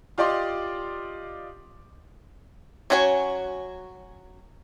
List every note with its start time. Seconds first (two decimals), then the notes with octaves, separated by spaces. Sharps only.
0.18 F4 G4 D5 D#5 C6
2.90 F#3 C#4 F#4 C#5 G#5